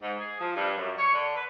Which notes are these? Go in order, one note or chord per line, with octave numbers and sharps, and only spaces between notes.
G#2
G#4
F3
G2
F#2
C#5
D3
B4